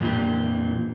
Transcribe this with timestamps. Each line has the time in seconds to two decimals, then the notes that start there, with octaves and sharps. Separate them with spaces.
0.01 F2 A#2 E3 D4 G4